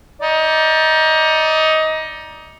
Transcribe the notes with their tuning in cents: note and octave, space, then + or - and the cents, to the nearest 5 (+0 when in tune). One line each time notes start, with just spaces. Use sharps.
D#4 +20 D5 +5